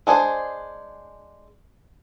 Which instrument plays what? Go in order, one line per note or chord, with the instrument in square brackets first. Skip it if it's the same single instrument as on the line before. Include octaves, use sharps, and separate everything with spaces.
[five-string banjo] G#3 D4 G#4 C5